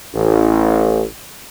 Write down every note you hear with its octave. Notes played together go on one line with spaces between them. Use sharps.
A1